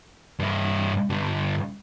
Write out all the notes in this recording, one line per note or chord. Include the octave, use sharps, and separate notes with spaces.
G2 E4
G2 D3